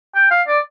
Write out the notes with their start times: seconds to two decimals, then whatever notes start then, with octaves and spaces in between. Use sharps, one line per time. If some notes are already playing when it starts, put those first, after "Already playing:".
0.15 G5
0.31 F5
0.48 D5